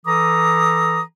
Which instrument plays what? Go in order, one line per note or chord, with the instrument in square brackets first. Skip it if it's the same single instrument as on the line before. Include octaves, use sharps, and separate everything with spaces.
[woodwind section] E3 A4 A#5 D6 D#6